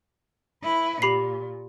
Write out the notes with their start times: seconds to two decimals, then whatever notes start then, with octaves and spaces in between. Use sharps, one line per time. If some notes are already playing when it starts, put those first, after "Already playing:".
0.63 E4 B4
1.02 A#2 G4 B5 C7